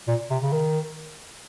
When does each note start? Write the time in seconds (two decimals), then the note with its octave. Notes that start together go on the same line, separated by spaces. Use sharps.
0.08 A#2
0.31 C3
0.43 C#3
0.53 D#3